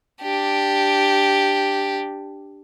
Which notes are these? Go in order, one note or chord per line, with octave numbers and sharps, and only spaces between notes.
D4 G4